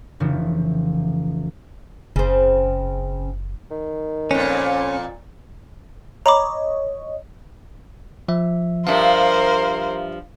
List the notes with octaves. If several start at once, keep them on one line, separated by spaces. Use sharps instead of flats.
F1 C#3 E3 F3
F#1 C#3 C4
D#3
F2 A#2 C#4
C#5 D#5 A#5 B5 D6
F3 E5
G2 F3 A#4 C5 E5 F5